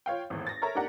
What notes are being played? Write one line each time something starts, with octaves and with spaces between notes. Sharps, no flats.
F4 C#5 F5 G5
G#1 E2 A2
A6 A#6
A4 A#4 C#5 E5 A#5
A#3 D4 D#4 G4 F#5 A#5